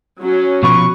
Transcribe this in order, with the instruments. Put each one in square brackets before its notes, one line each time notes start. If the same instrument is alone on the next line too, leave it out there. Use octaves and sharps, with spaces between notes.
[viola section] F#3 C#4
[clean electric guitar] B2 F3 B4 [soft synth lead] C#6